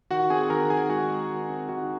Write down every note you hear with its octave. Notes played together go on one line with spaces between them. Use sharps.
D#3 F#4 F#5
C4 G#4 G#5
D#3 A#4 A#5
D#3 G#4 G#5
G#3 F#4 F#5
G#3
D#3
C4
D#3 F#4 F#5